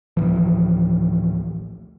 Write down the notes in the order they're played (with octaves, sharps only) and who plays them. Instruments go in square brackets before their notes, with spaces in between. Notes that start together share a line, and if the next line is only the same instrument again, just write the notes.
[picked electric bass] A1 D2 E3 F3